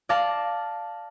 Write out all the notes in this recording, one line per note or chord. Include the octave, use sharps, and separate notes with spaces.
D5 F5 A5 A#6